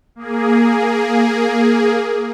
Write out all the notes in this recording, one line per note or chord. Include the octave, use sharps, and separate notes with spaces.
A#3 G#4